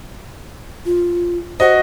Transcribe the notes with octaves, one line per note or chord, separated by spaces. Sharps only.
F4
F#4 C5 D#5